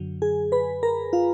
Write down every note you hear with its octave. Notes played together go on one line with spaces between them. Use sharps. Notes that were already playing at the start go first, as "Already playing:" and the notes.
Already playing: F#2 D3 F#3
G#4 G#5
B4 B5
A#4 A#5
F4 F5